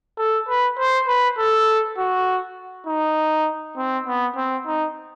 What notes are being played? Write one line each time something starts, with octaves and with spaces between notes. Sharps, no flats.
A4
B4
C5
B4
A4
F#4
D#4
C4
B3
C4
D#4